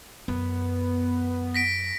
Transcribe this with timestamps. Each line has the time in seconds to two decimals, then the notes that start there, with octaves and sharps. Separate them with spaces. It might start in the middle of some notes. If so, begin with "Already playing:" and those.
0.28 F#2 B3
1.54 A#6 B6 D7